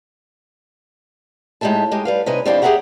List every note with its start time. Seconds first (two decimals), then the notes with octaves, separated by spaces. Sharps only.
1.61 A2 G#3 D#4 G4 E5 A5
1.91 G#3 D#4 G4
2.05 G3 B4 F5
2.26 C3 D#4 B4 G#5
2.46 F2 C4 D4 E4 G4 F5
2.62 G4 G#4 A#4 E5 F#5 A#5